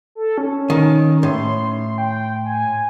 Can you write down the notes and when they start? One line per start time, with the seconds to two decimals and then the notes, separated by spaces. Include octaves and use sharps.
0.15 A4
0.38 C#4
0.70 D#3
1.23 A2 C6
1.98 G5
2.45 G#5